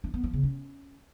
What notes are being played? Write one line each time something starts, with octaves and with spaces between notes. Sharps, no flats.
D4
B3
F3
C#3
C#4